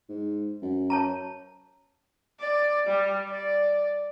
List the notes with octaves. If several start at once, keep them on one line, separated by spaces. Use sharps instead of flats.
G#2
F#2
C#5 A5 A#5
D5
G3
D5